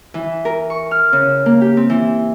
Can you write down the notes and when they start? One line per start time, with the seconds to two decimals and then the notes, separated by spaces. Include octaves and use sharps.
0.14 E3
0.45 A#4
0.70 C#6
0.91 F6
1.13 C#3
1.46 A#3
1.61 G4
1.77 C4
1.90 E3